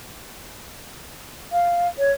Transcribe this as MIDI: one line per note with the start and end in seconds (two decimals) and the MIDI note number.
1.52 1.88 77
1.99 2.12 73